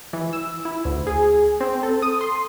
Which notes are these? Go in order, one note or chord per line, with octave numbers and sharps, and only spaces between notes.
E3
E6
E4
D2
G#4
C4
A4
D#6
C6